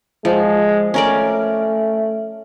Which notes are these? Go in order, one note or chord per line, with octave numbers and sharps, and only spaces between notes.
F3 G#3
A3 C#4 A#4 D5